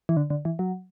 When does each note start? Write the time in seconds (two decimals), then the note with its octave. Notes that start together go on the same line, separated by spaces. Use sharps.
0.09 E3
0.17 D3
0.30 D3
0.45 E3
0.59 F#3